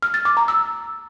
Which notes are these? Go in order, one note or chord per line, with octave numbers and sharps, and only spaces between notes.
F6
A6
D6
A#5
E6